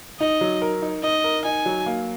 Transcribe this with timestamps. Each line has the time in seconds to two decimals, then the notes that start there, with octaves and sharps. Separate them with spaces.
0.20 D#4 D#5
0.41 F#3
0.62 A#4
0.82 D#4
1.03 D#4 D#5
1.24 A#4
1.45 D#4 G#5
1.66 F#3
1.86 A#3